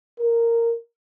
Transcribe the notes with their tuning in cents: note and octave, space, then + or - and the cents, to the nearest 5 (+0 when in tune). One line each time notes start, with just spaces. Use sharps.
A#4 -10